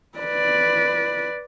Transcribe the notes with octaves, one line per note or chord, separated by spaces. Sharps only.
B4 D5